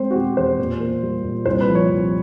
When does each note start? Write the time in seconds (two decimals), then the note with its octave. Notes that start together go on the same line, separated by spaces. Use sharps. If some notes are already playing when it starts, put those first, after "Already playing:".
Already playing: G#3 C4 C5
0.11 F#4
0.15 B2 G4
0.37 E2 C5
0.59 A#2
0.80 A#3
1.02 G3
1.24 A#2
1.46 C2 C5
1.61 B4
1.69 F3
1.75 C#5
1.89 C3